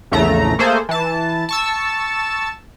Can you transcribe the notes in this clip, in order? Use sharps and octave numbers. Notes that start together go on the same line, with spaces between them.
A#1 E2 C#3 A3 A#5
A3 A#3 G#4 A4 C5
E3 A5
A5 C#6 E6